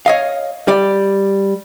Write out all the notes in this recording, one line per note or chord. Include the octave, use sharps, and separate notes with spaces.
C#5 D#5 F5
G3 D5